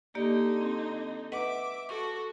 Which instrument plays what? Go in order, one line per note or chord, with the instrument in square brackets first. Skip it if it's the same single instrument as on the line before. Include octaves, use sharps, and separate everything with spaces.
[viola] D3 D#4 [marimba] A#3 G4 D5
[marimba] C4
[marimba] B4 D#5 F#5 [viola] E5 D6
[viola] F#4 A4 [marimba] C#6